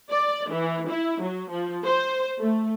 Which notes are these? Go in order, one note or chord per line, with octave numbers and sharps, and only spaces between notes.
D5
E3
E4
F#3
F3
C5
A3